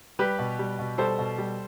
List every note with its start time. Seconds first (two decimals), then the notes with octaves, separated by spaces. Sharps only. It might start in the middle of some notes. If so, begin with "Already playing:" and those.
0.19 G3 G4 B4
0.39 B2
0.59 G3
0.79 B2
0.98 G3 A4 C5
1.18 B2
1.38 G3